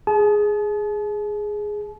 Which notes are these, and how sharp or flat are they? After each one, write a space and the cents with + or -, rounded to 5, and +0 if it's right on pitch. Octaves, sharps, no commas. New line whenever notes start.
G#4 +0 A5 -40